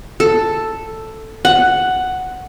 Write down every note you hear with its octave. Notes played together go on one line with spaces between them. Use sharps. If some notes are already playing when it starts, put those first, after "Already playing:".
A4
F#5